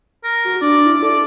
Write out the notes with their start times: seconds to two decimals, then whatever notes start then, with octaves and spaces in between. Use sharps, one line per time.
0.24 A#4
0.45 F#4
0.62 D4 D5
0.86 E4
1.03 A4 D5